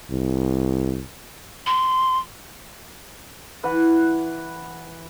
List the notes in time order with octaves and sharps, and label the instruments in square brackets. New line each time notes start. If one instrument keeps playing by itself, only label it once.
[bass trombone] C2
[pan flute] C6
[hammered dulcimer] E3 B4 F#5